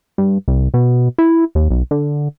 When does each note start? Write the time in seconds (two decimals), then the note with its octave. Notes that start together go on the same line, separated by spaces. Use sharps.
0.18 G2
0.48 C2
0.74 B2
1.18 E4
1.55 D#2
1.70 B1
1.91 D3